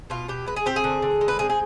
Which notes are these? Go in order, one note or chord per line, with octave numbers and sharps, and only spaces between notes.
B2 F4
B2 G4
G#3 B4
G#4
C4 G4
G#4
D3
D3
G#3
B4
C4 G#4
G#4